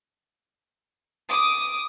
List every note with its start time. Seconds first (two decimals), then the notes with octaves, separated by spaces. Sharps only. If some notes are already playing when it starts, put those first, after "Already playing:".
1.30 D6 D#6